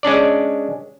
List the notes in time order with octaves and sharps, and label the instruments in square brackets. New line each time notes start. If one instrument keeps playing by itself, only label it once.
[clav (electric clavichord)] G#3 C#4 D4 D5